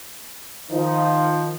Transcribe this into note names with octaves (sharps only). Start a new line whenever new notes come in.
D#3 F3 D#4